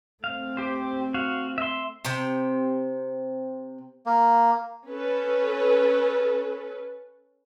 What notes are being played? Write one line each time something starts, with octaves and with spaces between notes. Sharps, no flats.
A3 C4 F5
G4 C5
F#4 F5
E5 C6
C3 C4 G5
A#3
C#4 A4 B4